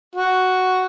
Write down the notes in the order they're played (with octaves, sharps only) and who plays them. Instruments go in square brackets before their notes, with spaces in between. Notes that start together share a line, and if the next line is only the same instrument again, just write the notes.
[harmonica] F#4